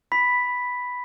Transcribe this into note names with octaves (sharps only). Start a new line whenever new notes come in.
B5 B6